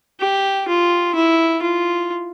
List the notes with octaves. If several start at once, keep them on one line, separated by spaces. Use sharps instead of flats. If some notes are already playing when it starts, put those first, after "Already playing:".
G4
F4
E4
F4